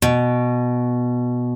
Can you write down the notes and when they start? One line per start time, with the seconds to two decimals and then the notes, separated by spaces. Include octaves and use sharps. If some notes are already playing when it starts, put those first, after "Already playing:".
0.02 B2